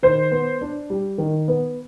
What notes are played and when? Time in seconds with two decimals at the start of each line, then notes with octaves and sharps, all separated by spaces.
0.03 D#3 C5
0.31 B3
0.61 D4
0.90 G3
1.18 D#3
1.48 B3